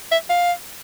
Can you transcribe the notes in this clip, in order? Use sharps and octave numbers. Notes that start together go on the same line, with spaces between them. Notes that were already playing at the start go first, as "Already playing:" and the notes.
E5
F5